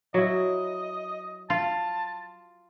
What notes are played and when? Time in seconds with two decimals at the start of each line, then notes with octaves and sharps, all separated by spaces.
0.14 F#3 E4 D#5
1.50 F4 A5